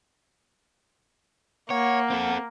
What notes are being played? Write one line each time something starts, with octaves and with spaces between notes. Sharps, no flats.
A#3 C#5 F#5
C4 A4